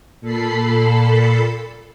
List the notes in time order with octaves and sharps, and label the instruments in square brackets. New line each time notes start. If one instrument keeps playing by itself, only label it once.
[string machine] A#2 A4 B5 C7